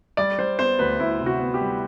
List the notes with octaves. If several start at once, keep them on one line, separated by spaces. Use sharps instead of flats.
G3 D5
G3 C5
B3 C5
D2 B4
D2 E4
C3
F#4
B3
G4
G3